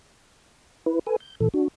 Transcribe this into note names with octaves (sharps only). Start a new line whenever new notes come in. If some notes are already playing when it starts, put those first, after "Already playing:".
E4 B4
A4 B4 G#5
G6
A#2 E3 A4
D4 F#4